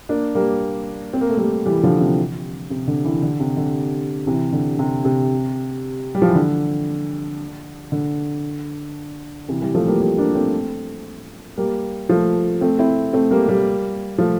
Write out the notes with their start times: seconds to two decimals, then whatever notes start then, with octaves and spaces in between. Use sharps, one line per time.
0.09 A#3 D4
0.35 G3 A#3
1.13 C4
1.21 A#3
1.30 A3
1.37 G3 A#3
1.66 E3 G3
1.83 D3 F3
2.00 C3 E3
2.70 C3
2.88 D3
3.04 C3 E3
3.22 D3
3.40 C3
3.57 D3
4.27 C3 E3
4.53 D3
4.79 C3
5.05 C3
6.15 G3
6.22 F3
6.29 E3
6.35 D3
7.92 D3
9.48 C3 E3
9.61 E3 G3
9.74 F3 A3
9.88 G3 A#3
10.01 G3 A#3
10.18 A#3 D4
10.35 A3 C4
11.57 G3 A#3
12.09 F3 A3
12.61 A3 C4
12.79 C4 E4
13.13 A3 C4
13.31 G3 A#3
13.49 G3 A#3
14.18 F3 A3